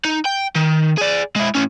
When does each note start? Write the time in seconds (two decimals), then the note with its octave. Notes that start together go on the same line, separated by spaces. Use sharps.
0.05 D#4
0.25 G5
0.56 D#3
0.98 G#4 D5
1.36 G#3 E4
1.55 A2 C#4